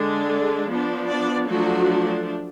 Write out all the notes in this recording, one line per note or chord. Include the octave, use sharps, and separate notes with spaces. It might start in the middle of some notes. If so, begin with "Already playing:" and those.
Already playing: D3 G#3 D4
F3 B3 D4
D4 D5
F3 F#3 A3 D4 F#4